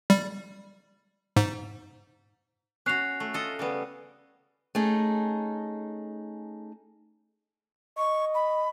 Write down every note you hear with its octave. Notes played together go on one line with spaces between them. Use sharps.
G3
G#2
C#4 F#4 F#6 C7 F7
A3
F4 A4 D#5
C#3 G3 B3
A3 C#4 D#4 G#4
D#5 C#6
B5